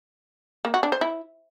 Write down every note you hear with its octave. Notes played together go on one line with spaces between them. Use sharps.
A#3
F#4
D4
C5
E4